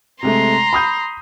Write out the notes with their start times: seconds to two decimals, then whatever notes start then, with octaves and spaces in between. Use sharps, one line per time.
0.23 C3 G#3 A3 A#5 C6
0.73 B5 D#6 G6